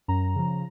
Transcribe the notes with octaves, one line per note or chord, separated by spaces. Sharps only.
F#2 A#5
C#3 F3